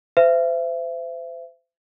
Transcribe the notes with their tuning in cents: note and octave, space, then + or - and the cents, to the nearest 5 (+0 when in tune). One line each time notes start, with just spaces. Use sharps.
C5 -35 E5 +35